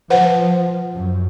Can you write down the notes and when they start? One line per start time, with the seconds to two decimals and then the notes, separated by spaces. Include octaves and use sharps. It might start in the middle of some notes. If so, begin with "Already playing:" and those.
0.10 F3 B4 C5 F#5
0.96 F#2